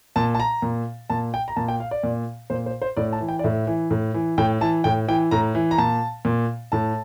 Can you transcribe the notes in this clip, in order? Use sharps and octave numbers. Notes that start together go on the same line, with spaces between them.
A#2 A5
A5
A#5
A#2
A#2 A5
G5
A#5
A#2 A5
G5
F5
D5
A#2
A#2 C5
C5
C5
A2 D5
A5
E3
G5
D5
A2 E5
E3
A2
E3
A2 G5
E3 A5
A2 G5
E3 G5
A2 A#5
E3
A#5
A#2 A5
A#2
A2 A5